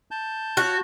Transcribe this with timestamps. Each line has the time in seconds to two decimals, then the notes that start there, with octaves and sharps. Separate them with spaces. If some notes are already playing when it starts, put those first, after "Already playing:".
0.11 A5 G6
0.57 F#4 C#5 F5 F#6